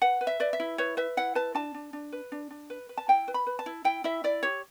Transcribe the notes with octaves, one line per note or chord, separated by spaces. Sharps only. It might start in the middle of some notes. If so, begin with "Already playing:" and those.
B4 F#5
B4
E5
B4 D5
E5
E4
B4 C#5
B4 E5
E4 F#5
B4 A5
D4 A5
D4
D4
B4
D4
D4
B4
B4
A5
E4 G5
B4
B5
B4
A5
E4
E4 G5
E4 E5
E4 D5
G4 C#5